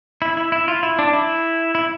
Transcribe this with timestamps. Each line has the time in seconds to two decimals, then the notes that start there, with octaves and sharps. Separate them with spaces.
0.22 E4
0.37 E4
0.52 E4
0.68 F4
0.83 E4
0.99 D4
1.13 E4
1.75 E4